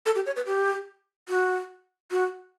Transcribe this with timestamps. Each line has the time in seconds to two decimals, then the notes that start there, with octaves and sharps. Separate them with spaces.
0.06 A4
0.15 G4
0.26 C#5
0.36 B4
0.46 G4
1.29 F#4
2.11 F#4